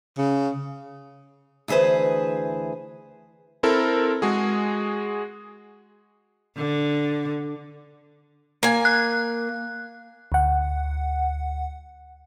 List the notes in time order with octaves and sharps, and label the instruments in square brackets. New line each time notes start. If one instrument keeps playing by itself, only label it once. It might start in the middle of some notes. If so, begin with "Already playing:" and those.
[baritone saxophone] C#3
[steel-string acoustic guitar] D2 E3 G#4 B4 C5
[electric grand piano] C4 E4 A4 A#4
G#3 F#4 G#4
[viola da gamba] D3
[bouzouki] A#3 G#5
[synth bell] F#6
[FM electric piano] D2 F#5